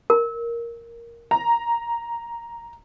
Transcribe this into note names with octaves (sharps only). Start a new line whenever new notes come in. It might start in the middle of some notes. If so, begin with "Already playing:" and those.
A#4
A#5